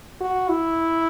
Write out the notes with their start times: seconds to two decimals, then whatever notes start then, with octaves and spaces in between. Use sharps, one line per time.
0.21 F#4
0.49 E4